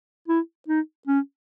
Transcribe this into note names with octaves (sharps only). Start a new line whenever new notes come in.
E4
D#4
C#4